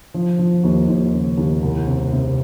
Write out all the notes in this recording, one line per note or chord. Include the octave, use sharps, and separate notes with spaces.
F3
F3
D#2
D#2
C#3
D#2
C2
C3
C3